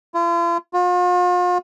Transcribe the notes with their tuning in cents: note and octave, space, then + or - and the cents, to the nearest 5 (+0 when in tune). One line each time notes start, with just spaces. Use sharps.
F4 -45
F4 +40